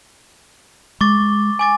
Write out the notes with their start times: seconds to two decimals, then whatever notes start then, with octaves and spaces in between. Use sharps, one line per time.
1.01 G#3 C#6 D6 A6
1.59 G#5 D6 A6